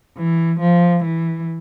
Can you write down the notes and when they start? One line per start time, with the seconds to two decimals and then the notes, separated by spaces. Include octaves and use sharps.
0.17 E3
0.60 F3
1.04 E3